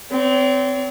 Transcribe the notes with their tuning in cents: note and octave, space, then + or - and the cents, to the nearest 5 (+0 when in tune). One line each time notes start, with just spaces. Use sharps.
C4 -25 C#5 +40